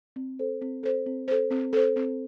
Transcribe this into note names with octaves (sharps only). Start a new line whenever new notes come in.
C4
A4 C5
C4
A4 C5
C4
A4 C5
C4
A4 C5
C4